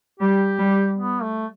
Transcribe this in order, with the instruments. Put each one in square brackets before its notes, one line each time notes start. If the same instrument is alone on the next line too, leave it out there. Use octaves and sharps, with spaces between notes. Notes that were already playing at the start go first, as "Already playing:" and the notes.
[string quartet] G3 [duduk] G4
[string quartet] G3
[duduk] B3
A3